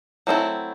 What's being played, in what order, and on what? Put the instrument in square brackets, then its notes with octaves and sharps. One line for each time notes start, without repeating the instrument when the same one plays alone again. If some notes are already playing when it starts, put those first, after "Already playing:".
[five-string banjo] F#3 A3 C4 E4